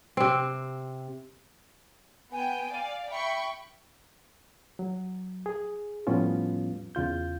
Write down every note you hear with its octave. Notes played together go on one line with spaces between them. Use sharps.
C3 C4
B3 G5 G#5
D5 F5
E5 G5 B5 C#6
F#3
G#4
A2 F3 G3 B3 C#4 F4
E2 C#3 F4 G6